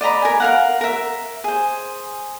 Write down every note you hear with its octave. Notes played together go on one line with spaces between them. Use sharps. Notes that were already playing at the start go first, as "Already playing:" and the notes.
D5 D#5 A#5 B5
A#4 G#5
A#4 F5 F#5
A#4 E5
G#4 C5